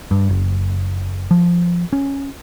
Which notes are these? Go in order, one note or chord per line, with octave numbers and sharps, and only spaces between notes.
G2
F#1
F3
C#4